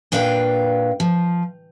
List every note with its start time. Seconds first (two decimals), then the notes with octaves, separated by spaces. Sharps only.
0.12 A#2 D4 B4 F5 G5
1.00 F3